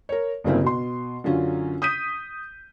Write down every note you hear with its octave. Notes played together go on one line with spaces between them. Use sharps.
A#4 C#5
G1 F#2 C#3 A#3 C4 E4
B2 C6
F#2 D3 C#4 F4
D#6 G6 B6 D#7